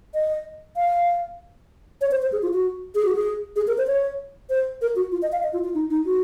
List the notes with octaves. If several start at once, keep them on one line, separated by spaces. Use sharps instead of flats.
D#5
F5
C#5
C5
C5
G#4
F4
F#4
G#4
F#4
G#4
G#4
A#4
C5
C#5
C5
A#4
F#4
F4
D#5
F5
D#5
F4
F4
D#4
D#4
F#4